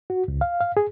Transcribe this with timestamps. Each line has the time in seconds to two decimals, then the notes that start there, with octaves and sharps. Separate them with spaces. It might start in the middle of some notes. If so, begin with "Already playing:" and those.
0.10 F#4
0.28 C#2
0.41 F5
0.61 F5
0.77 G#4